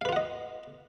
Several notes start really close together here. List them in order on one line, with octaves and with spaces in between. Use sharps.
F5 B4 F4 F#5 D#5